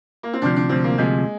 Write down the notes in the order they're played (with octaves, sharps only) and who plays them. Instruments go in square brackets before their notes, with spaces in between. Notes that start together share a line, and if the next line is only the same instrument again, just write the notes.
[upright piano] A#3
C4
[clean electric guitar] D2 C3 F3 [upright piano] D4
[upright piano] D4
[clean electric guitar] D2 C3 F3 [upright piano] C4
[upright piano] A#3
[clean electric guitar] D2 C3 F3 [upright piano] G#3